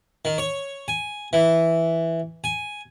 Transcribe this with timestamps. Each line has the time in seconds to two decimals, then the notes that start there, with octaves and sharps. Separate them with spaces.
0.25 D#3
0.38 C#5
0.88 G#5
1.33 E3
2.44 G#5